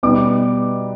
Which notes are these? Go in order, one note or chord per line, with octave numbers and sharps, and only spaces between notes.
B2 G3 B3 D#4 D6